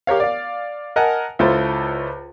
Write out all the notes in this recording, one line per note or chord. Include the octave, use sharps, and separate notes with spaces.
G4 A#4 C#5 F5
D5 F5
A#4 D#5 F#5 G#5 A5
C#2 E4 F4 A4 C5 A5